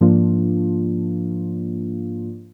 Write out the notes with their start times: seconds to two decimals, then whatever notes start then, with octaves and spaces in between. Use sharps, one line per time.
0.01 G#2 F3 A#3 D4 F4